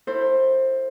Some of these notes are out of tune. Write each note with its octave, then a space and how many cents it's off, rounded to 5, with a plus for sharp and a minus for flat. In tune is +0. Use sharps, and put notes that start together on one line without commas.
E4 +0 A4 +40 C5 +15